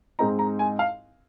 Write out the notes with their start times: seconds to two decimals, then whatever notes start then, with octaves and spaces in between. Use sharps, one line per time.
0.19 G#2 G#3 C4 D#4 A#5
0.39 A#5
0.59 G#5
0.79 F5